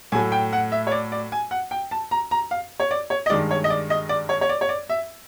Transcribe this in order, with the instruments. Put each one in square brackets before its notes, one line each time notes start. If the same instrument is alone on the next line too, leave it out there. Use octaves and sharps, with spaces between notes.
[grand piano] A2 F#3 A3 G#5
G5
F#5
E5
C#5
D5
D5
G#5
F#5
G5
A5
A#5
A#5
F5
C#5
D5
C#5
D#5
G2 D#3 G#3 D5
C#5
D#5
D5
D#5
D5
C#5
C#5
D5
C#5
D5
E5